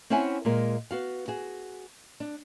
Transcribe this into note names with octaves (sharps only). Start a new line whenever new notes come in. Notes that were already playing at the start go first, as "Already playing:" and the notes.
C4 C#4 E4 E5 F#5 G#5
A#2 G#3 A#4
B3 F#4 F5
F#4 G#4
D4